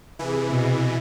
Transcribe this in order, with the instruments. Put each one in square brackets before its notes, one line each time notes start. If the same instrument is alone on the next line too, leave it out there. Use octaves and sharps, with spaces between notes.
[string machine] C3 G#4 [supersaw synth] E3
[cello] B2